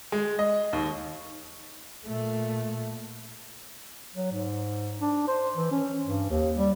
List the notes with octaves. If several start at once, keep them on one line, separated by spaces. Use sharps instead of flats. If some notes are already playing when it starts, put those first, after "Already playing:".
G#3
D#5
D#2
A#2 A3
F#3
G#2
D4
C5
E3
C#4
G2
D#2
G3